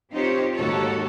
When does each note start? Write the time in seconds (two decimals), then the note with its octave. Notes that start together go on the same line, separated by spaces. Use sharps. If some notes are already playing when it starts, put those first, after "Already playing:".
0.12 C4 D#4 F4 G4 C5 C#5
0.54 D#2 G#2 F#4 G4 A4 C#5